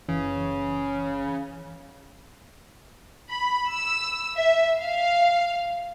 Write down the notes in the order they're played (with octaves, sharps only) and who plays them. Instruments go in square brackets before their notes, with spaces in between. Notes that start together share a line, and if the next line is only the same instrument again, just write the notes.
[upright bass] F#1 E4 [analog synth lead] C#3 [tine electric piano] E3
[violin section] B5
E6
E5
F5